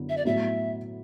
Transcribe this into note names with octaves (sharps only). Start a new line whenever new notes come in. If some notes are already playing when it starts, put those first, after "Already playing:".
Already playing: F#2 D3 B3 E4
E5
D5
A2 F#3 B3 E4 E5